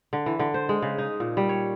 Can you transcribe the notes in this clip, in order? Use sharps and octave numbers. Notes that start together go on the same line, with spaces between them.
D3
E3
D3
C5
G#3
C#3
D#4
A#2
G3
C#5